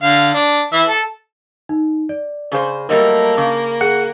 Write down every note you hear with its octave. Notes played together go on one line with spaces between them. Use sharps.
D3 F5
D4
E3 E5
A4
D#4
D5
C#3 G#4 C5
F#3 G3 A3 A#3 A#4 D#5 E6
C#3 D6
G#4 F#5